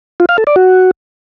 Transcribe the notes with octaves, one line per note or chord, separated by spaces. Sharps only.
F4
F5
A4
D5
F#4